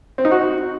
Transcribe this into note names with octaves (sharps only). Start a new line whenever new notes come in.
C4
D#4
F#4